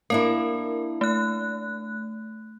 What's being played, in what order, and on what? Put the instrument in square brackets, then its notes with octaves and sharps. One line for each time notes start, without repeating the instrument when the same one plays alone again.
[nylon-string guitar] A#3 D4 E4 [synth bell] A#4
[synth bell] A3 F#6